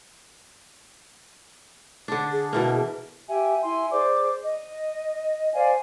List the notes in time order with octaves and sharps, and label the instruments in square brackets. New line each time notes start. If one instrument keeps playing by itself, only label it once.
[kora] D3 D4
[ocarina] G#4
[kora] B2 E3 A#3
[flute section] G4 E5 G5 G#5
E4 G#5 C6
G#4 C5 D5 D6
D#5
C5 D5 F5 G#5